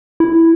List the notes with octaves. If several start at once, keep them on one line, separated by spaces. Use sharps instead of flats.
E4